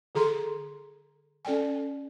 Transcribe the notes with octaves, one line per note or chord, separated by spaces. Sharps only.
D3 G#4 A4 A#5 C6
C#4 A4 D5 G5 G#5